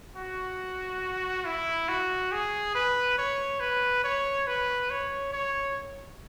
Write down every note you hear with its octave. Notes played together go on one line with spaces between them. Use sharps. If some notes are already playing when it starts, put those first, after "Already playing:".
F#4
E4
F#4
G#4
B4
C#5
B4
C#5
B4
C#5
C#5